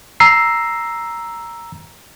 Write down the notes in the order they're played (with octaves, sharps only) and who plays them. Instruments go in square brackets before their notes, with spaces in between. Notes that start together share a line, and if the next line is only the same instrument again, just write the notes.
[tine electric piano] A#5 E6 C7